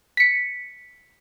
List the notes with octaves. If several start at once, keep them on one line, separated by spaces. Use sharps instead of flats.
B6 C#7